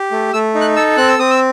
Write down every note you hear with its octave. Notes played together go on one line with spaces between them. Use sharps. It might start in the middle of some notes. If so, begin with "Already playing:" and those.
Already playing: G4
A3
A3 E6
D#4
F#6
A4 E6
C4 F#6
E6
C4 D#6
E6